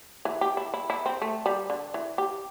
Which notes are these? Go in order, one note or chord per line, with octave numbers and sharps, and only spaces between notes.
E3
G4
E4
E4
E4
C4
A3
G3
D3
E3
G4